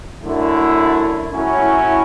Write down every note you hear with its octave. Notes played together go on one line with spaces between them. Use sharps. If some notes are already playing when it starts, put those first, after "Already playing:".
F#2 D3 A3 E4
A2 F#3 C#4 E4